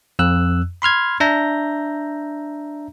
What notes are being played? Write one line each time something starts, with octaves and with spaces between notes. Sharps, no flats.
F2 E6 F#6
B5 C6 F6 G#6
D4 E5 A#5 G6 A#6